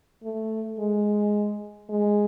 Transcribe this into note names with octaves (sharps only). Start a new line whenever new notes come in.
A3
G#3
G#3